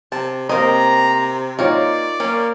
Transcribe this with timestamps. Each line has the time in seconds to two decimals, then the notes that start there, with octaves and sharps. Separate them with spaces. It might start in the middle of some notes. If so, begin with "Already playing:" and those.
0.12 C3 A5
0.49 C3 A#3 C4 D#5 A#5
1.59 A#3 C4 D#4 F4 C#5 D5
2.20 A#3 C#4